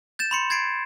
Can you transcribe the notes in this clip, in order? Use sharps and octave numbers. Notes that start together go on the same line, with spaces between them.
G6 A6 E7
B5 C6 C#7
G#6 A6 C7 D7